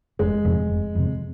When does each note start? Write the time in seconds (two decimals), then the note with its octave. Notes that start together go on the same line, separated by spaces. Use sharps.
0.19 F1 G#3
0.45 F2 C3
0.69 F1
0.95 F2 C3